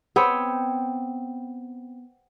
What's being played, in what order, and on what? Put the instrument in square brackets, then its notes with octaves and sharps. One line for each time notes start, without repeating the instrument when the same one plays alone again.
[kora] B3 C4 C#5 G5